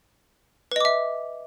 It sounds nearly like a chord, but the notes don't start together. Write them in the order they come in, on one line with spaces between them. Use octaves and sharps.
B4 D#5 D6 E5